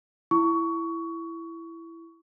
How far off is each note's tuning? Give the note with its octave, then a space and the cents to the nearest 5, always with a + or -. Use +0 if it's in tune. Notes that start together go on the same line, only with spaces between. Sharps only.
E4 +10 C#6 +20